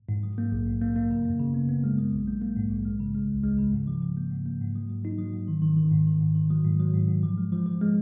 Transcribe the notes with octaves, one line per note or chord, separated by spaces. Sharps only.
G#2
F#3
A#3
A#1
G#2
A#3
A#3
C#3
F#2
C#3
B3
B3
G#3
F#3
A#1
A#3
A#3
G#2
A#1
G#3
C#3
G#3
C#2
G#3
C#3
G#2
F3
F3
A#3
G#2
A#3
G#2
F#3
F#3
D#4
F#3
G#2
D#3
D#3
D#3
G#2
D#3
G#2
D#3
F#3
G#2
F#3
G#2
G#2
F3
G#3
F3
F3
G#3